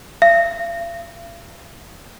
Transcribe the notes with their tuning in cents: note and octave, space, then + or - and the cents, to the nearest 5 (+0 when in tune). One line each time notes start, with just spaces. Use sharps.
F5 -45